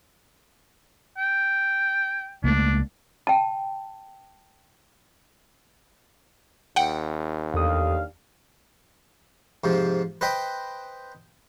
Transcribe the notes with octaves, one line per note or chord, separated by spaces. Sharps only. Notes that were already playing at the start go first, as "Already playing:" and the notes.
G5
C#2 A3 A#3 D4
G5 A5
D#2 F#5 G5
E2 D4 G4 A4 F5 D#6
G#2 C3 F3
B4 C5 D#5 G5 B5